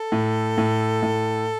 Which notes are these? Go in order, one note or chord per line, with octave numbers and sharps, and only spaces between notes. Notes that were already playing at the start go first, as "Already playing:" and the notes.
Already playing: A4
A2
A2
A2